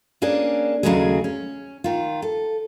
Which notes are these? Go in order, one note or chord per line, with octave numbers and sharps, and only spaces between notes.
A#3 C#4 D4 G#4
D#2 C#3 F#3 G#3 A3 G#4
C#4
D#3 F4
A4